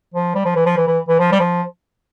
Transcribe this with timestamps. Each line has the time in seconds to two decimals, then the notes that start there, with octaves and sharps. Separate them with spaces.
0.14 F3
0.35 G3
0.45 F3
0.56 E3
0.66 F3
0.77 E3
0.87 E3
1.08 E3
1.19 F3
1.32 G3
1.40 F3